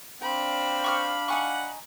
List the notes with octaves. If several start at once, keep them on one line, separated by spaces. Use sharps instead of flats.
C4 D4 F5 G5 B5
C#6 D#6 F6
D#4 F#5 G#5 C#6